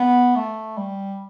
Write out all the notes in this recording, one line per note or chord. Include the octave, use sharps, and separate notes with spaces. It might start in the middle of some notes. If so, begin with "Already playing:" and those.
Already playing: B3
A3
G3